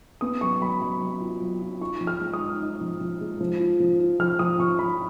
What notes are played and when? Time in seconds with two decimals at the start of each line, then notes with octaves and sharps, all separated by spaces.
0.21 B3 D#6
0.41 F#3 C#6
0.61 F#3 B5
0.81 F#3 B5
1.02 F#3
1.21 F4
1.42 F#3
1.61 F4
1.80 D#4 C#6
2.00 F3
2.07 F6
2.21 G#3
2.34 D#6
2.40 D#4
2.61 D#4
2.81 F3
3.01 F3
3.21 G#3
3.41 F3
3.60 F4
3.80 F3
3.99 F4
4.19 F3 F6
4.39 F3 D#6
4.59 F3 C#6
4.79 F3 B5